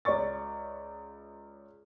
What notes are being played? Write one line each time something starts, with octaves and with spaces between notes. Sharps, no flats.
C#2 C#5 D5 C#6 A6